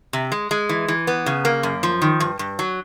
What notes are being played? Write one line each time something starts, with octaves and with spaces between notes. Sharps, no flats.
C3
G#3
G#3
E3
E3
B3
C#3
A#3
F#2
F3
D#3
G2
G2
F#3